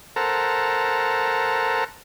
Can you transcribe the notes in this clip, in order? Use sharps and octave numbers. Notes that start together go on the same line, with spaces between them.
A4 A#4 C5 F#5 A5 A#5